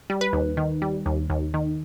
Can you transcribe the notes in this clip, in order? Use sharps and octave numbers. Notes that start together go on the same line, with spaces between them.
G3
B4
D#2
D#3
G3
D#2
D#2
D#3